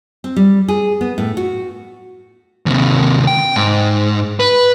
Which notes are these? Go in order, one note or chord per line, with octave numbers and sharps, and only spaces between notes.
C4
G3
G#4
B3
A2
F#4
D#2 C3
G5
G#2
B4